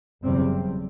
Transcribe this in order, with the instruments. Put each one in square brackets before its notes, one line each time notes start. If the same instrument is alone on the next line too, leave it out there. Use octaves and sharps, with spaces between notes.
[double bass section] F#1 E2 C3 G3 C4